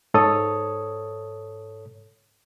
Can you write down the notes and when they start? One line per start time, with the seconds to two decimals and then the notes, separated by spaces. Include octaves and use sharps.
0.14 G#2 A4 C#5 D#6